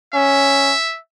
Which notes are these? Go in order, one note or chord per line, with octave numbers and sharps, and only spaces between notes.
C#4 E5